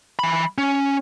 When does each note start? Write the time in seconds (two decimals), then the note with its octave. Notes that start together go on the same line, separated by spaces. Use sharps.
0.19 E3 B5
0.58 C#4